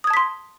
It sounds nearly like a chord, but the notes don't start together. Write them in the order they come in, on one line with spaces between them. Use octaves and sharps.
D#6 G#6 A5 B6 C6